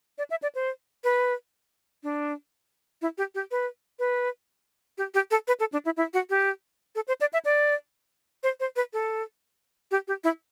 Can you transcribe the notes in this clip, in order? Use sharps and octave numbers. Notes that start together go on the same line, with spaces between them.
D5
E5
D5
C5
B4
D4
E4
G4
G4
B4
B4
G4
G4
A4
B4
A4
D4
E4
E4
F#4
G4
A4
C5
D5
E5
D5
C5
C5
B4
A4
G4
G4
E4